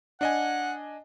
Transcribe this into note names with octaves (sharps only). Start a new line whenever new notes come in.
D4 D#5 F#5 G#5